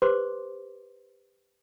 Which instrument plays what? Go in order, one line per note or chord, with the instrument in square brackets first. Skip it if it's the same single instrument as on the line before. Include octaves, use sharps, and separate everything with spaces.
[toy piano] G4 B4 C5 C6 D6